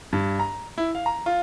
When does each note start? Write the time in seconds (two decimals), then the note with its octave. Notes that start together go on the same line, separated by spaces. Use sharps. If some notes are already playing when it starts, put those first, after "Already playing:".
0.13 G2
0.39 A#5
0.78 E4
0.95 F5
1.06 A#5
1.26 F4